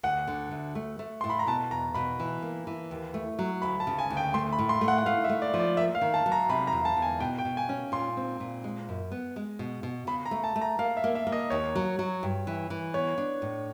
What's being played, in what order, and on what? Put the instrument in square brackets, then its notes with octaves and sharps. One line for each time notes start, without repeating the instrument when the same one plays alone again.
[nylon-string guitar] D2 [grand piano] F#5
[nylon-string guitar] D3
D2
A3
A3
[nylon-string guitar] A2 [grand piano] C6
[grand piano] B5
A#5
[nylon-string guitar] B2 [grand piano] A5
[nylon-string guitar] E2 [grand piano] A#5
[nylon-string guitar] B2 [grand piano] B5
[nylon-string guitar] E3
A#3
E3
D#2
A3
F#3
[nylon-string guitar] D2 [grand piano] B5
[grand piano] A5
[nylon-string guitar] C#3
[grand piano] G#5
[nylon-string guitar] D2
[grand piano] G5
[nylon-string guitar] A3 [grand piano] C6
[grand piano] B5
[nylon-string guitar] A2
[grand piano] C6
[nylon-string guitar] A3
[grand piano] F#5
F#5
[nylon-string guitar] A3 [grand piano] F5
[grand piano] E5
[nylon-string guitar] A3
[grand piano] D5
[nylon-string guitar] F3
[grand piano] D5
[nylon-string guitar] A#3 [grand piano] E5
[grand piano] F5
[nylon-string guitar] D#3
[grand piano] A5
[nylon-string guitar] F#3
[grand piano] A#5
[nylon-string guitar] C3 [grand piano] B5
[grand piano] A#5
[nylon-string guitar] E2
[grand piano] A5
[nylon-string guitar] E2
[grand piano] G#5
[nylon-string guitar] B2 [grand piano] G5
[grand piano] G5
[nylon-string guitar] B2
[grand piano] G#5
[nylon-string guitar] C#4
[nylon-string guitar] A#2 [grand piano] C6
[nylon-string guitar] C4
A#2
G#3
F#2
B3
G#3
B2
B2
[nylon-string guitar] C#3 [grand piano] B5
[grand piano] A#5
[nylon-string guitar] A3
[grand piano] A5
[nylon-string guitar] A3
[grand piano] A#5
[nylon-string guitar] A#3 [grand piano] F5
[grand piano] E5
[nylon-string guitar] A#3
[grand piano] E5
[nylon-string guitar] A#3
[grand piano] D#5
[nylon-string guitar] D#2 [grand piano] C#5
[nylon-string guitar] F#3
F#3
G2
E3
E3
[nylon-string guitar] B3 [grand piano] C#5
[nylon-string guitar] D4
A2